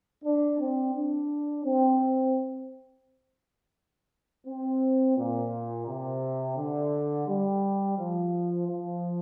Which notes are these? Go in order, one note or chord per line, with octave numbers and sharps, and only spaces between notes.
D4
C4
D4
C4
C4
A#2
C3
D3
G3
F3
F3